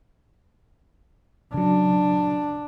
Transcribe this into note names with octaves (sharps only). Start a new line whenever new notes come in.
C#3 F#3 D4